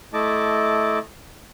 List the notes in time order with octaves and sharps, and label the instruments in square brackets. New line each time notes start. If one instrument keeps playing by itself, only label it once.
[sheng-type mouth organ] A3 E4 D#5 A5 D6